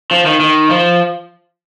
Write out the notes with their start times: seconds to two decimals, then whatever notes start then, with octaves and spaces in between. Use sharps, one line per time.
0.11 F3
0.26 D#3
0.40 D#3
0.70 F3